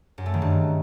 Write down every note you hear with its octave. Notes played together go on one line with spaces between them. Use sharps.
F#2
A3
D#3
G2